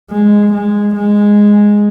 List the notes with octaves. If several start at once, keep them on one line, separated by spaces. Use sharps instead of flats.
G#3
G#3
G#3